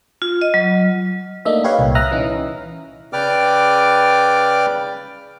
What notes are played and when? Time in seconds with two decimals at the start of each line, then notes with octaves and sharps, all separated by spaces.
0.22 F4
0.41 D#5
0.54 F#3
1.45 A3 A#3 D4 D#4 D#5 E5
1.64 G4 B4 C#5 F5
1.78 C2 A#2
1.95 E5 A#5 D#6 F6 F#6 A#6
2.12 E3 C#4 D#4
3.13 C#3 B4 D5 G5 D6 F6